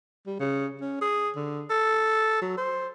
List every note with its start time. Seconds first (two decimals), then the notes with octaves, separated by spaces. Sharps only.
0.27 G3
0.40 C#3
0.81 C#4
1.02 G#4
1.36 D3
1.70 A4
2.42 F#3
2.58 C5